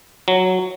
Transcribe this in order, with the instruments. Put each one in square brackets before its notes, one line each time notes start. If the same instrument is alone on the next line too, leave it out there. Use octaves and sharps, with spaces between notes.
[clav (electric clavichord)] F#3